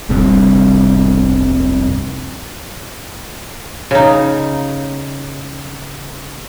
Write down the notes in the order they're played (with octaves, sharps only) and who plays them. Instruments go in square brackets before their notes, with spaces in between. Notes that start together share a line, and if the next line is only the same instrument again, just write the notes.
[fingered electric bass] F1 C2 G2 C3
[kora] C#3 D#4